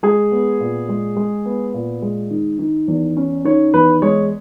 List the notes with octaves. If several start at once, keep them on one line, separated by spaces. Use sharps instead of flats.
G#3 G#4
B3
A#2
G#3
G#3
B3
A#2
G#3
D#3
D#3
E2
C#4
D#3 C#5
E2 B4
G#3 C#5